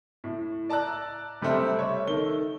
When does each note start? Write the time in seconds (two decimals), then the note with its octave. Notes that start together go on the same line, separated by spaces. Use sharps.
0.24 A2
0.70 D5 A5 A#5 E6 F#6
1.41 C3 G3 A3 C4
1.79 C#5 E5
2.07 D#3 A4 G7